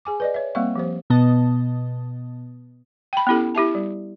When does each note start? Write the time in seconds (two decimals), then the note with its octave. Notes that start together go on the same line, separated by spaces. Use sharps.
0.05 G#4 G#5 D6
0.20 B4 D5 D#5
0.34 C#5 E5
0.55 G3 A#3 C4 E5 F5 C#6
0.76 F3 G4 C5
1.10 B2 B3 D#5 A5
3.13 G5 B5
3.27 B3 C#4 E4 G4 A4
3.55 E4 G4 E5 A5
3.75 G3